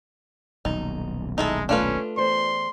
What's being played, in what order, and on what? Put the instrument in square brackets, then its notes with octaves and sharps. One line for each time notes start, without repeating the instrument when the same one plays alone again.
[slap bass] D#1 B1 [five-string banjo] D#4
[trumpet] G#3 [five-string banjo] D#4 E4 A4
[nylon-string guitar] A3 [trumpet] C#4 [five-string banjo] D4 F4 B4
[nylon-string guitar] E2 C5 D5 [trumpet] C6